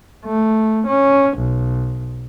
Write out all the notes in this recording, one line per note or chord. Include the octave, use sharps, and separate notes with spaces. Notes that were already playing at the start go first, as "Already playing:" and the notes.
A3
C#4
B1